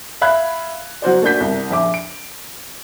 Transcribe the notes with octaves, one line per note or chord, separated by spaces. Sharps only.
E5 F5 B5 F#6 G#6
F#3 F#4 C5 D5
A3 A#3 D4 F#4 G6 B6
C2
A#1 E5 D6
D7